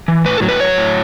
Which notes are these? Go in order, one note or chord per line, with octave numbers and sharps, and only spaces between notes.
E3
A2 B4
A4
F#3
B4
F#3 C#5
A2